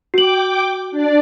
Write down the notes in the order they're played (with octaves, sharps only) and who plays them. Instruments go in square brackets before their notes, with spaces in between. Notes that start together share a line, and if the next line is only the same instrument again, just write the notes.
[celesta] F#4 F#7 [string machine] G5 D6
[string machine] D4 D5